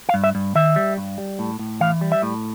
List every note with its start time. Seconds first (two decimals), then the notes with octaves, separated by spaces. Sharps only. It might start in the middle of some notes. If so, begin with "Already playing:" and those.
0.09 F5
0.14 G2
0.24 E5
0.35 G2
0.55 D#3 E5
0.76 G3
0.98 G2
1.18 G3
1.39 A2
1.59 A2
1.81 E3 F5
2.01 G3
2.12 E5
2.22 A2